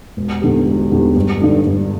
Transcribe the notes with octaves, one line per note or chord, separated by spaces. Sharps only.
E1
E2 D3 G3
E1
E2 D3 G3
G1
G2 D3 G3 D4
G1